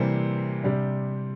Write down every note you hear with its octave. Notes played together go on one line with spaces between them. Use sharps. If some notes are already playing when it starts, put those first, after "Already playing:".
Already playing: C3 E3 G3 A#3 D4 C5
C3 G3 D4